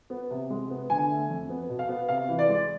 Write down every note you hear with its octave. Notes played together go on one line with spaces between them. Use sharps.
B3
C3
G#3
B3
D3 G#5
A3
F2
B3
B2
F5
B3
C3 F5
E3
D5
G#3